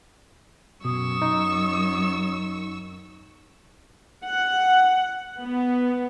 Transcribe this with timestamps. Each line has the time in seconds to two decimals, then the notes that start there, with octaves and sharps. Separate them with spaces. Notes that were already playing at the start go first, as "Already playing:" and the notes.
0.85 F#2 B2 C#6 D#6 E6
1.22 D#4
4.26 F#5
5.42 B3